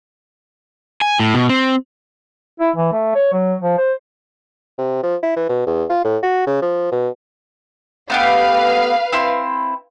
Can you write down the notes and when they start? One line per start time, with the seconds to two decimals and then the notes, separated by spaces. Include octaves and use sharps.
1.01 G#5
1.19 A2
1.34 B2
1.50 C4
2.60 E4
2.76 E3
2.93 A3
3.15 C#5
3.33 F#3
3.62 F3
3.78 C5
4.78 C3
5.03 F3
5.23 E4
5.36 E3
5.49 B2
5.67 E2
5.90 F4
6.05 A2
6.23 F#4
6.47 C#3
6.62 F3
6.92 B2
8.10 A3 B3 G4 B4 F5
9.13 C4 E4 C6